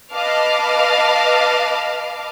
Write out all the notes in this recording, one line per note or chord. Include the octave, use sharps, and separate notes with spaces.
B4 D#5 F5 A5 D6 F6